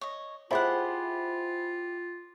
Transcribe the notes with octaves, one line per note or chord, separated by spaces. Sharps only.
C#5 D#5
E4 F4 G4 G#4 C5 F#5 B5